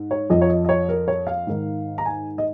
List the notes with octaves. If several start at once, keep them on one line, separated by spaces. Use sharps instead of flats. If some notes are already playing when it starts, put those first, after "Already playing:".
Already playing: G#2
C#5
F2 F3 D#5
C#5
D#5
D#5
C#5
A#4
C#5
F5
G#2 D#3
A#5
G#5
D#5